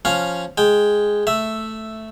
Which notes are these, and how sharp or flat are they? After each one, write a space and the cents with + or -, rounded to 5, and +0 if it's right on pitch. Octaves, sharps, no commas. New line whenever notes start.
F3 +0 C#4 +0 F5 +0
G#3 +0 G5 +0
A3 +0 E5 +0